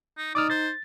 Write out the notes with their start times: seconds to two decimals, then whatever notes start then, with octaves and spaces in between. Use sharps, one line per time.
0.17 D#4
0.35 D#4 D5 D6 D#6 F6
0.50 C5 A6